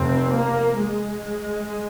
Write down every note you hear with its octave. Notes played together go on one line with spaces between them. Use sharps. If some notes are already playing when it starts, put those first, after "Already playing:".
Already playing: F1 F2 C3 C4
A#3
G#3